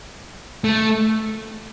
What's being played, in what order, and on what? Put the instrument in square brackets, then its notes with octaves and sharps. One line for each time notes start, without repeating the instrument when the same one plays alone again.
[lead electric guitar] A3